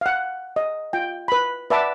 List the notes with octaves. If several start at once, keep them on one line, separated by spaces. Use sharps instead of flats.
F5 F#5
D#5
F4 G5
B4 B5
B4 D5 E5 F#5 A5 D6